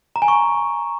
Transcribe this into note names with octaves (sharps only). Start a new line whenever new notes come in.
A#5
G#5
C#6